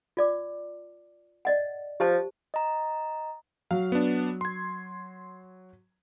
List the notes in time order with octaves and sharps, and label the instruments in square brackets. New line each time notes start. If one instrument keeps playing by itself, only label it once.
[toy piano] F4 D5 D6
D5 D#5 F#5
[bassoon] F3 [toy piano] G4 C5 A5
[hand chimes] D#5 A#5
[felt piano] F#3 [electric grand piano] F5
[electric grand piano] B3 D4
C6 G#6